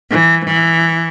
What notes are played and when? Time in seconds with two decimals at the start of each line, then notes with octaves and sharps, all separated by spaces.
0.10 E3
0.45 E3